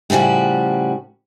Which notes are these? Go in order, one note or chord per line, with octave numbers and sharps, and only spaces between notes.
A2 C#3 F3 G3 F#4